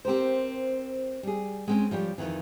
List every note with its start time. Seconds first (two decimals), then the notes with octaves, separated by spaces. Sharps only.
0.05 C4 G4 A#4 C5
1.23 G3 G#4
1.67 G#3 C4 C#4
1.91 F3 G3 C#5 G5
2.18 F2 A#2 D#3 E3